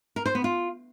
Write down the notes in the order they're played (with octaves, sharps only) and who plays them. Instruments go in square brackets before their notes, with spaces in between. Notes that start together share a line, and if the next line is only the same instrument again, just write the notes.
[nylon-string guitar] A#4
C5
B3
F4